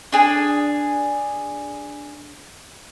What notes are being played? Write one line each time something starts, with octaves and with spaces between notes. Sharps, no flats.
D4 G#4 G#5